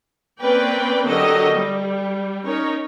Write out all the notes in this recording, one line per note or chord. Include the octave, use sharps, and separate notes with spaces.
A#3 C4 C#4 B4 D5 G5
D3 F#3 G4 A4 A#4 D#5
G3
C#4 D#4 A#4 C#5